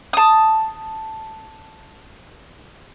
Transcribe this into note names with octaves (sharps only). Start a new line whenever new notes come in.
A5 D#6